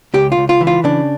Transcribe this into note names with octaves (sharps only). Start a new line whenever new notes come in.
C#2 G4
F4
C#2
F4
E3
F4
C#3 D4